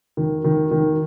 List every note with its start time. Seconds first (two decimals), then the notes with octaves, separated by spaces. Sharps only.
0.17 D#3
0.44 D#3
0.71 D#3